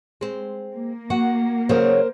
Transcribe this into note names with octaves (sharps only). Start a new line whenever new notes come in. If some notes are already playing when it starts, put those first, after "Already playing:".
G#3 C4
A#3
F#4 F#5
C#3 F#3 A#4 C5